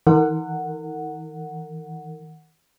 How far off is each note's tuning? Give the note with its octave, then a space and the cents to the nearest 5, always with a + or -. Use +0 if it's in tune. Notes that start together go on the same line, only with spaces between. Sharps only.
D#3 +40 A#4 -35 F#5 +0